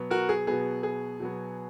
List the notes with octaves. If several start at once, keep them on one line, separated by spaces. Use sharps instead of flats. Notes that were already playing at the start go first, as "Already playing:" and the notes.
Already playing: B2 F#3 B3
F#4 A#4
G#4
B2 F#3 B3 G#4
G#4
B2 F#3 B3